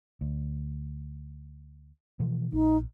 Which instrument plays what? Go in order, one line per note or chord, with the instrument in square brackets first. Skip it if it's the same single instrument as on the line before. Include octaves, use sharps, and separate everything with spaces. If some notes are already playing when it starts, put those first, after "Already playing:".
[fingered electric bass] D2
B2 E3 F3
[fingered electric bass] A#1 [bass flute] D#4